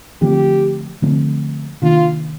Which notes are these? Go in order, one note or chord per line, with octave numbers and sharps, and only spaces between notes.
D3 F3 A3 C4 G4
D3 F3 A3 C4
C3 D#3 A#3 D4 F4